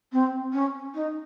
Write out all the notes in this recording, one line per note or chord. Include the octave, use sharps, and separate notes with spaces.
C4
C#4
D#4